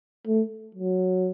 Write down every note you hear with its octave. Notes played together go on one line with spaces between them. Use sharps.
A3
F#3